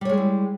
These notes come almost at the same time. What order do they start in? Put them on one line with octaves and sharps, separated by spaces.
G3 C#5 G#3 G#4 E4